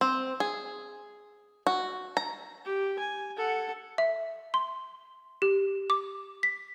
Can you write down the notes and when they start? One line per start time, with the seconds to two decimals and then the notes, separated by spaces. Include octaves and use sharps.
0.01 C4
0.40 G#4
1.67 F#4
2.17 A#5
2.65 G4
2.99 G#5
3.37 A4 F#5
3.98 E5
4.54 C6
5.42 G4
5.90 D6
6.43 B6